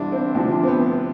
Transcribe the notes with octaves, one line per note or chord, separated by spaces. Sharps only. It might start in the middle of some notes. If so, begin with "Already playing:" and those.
Already playing: C2 C3 E3 D4 E4
C4
D2 C3 F3 D4
D4
C4
B3